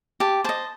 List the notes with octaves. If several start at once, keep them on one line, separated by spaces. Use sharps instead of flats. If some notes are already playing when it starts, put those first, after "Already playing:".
G4 A5
C5 D#5 A5